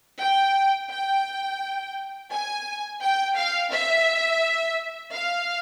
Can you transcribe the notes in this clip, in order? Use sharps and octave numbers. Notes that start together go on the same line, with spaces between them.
G5
G5
G#5
G5
F5
E5
F5